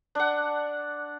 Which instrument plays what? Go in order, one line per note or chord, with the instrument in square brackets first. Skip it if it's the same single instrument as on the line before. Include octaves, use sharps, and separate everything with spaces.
[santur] D4 F#5